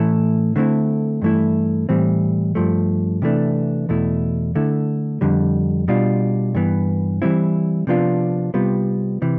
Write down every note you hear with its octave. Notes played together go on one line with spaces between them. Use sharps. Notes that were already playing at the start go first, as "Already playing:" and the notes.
Already playing: A2 E3 A3 E4
D3 A3 C4 E4
G2 E3 A3 E4
A2 E3 G3 C4
G2 F3 A3
C3 E3 A3 D4
E2 B2 A3 E4
D3 A3 E4
F2 D3 G3
B2 G3 D4 F4
G2 E3 B3
E3 G3 C4 E4
C3 F3 B3 D4 F4
C3 G3 B3 F4
C3 E3